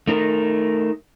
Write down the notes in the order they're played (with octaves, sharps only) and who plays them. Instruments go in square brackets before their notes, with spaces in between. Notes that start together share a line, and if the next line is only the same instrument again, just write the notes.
[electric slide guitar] A3 D#4 A#4